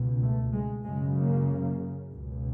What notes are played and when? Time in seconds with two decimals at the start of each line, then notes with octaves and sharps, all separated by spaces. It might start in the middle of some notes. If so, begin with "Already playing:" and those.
Already playing: C#2 B2
0.22 A3
0.54 G#3
0.85 F#2 C#3 G#3
1.17 A#3
2.13 C#2 B2